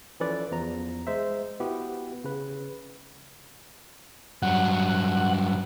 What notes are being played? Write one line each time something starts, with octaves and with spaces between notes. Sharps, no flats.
E3 F3 C#4 A4 B4 D5
E2 F3 A#5
G#3 C5 E5
B3 E4 F#4 G4
C#3 B4
G2 F#3 F#5